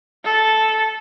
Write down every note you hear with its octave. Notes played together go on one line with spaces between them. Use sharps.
A4